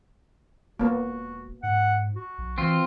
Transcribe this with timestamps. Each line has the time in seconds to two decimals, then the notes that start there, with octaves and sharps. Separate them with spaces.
0.79 E1 A#3 B3 F#4
1.63 G#2 F#5
2.16 F#4
2.38 B1
2.58 E3 C4 F4